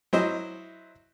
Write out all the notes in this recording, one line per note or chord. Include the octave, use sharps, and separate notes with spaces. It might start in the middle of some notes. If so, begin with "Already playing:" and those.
F#3 E4 C5 D#5